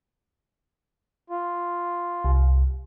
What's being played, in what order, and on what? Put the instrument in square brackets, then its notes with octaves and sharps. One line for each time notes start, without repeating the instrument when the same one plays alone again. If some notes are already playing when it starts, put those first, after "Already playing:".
[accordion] F4
[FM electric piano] C2